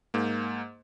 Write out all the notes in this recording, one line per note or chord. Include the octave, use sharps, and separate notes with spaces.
G#2 A#3